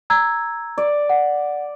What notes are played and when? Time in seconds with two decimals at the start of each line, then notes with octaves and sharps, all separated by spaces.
0.10 A#5 E6 G#6
0.78 D5
1.10 F#5